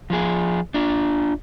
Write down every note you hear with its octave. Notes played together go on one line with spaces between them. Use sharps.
F3 F4 G#4
D4 F4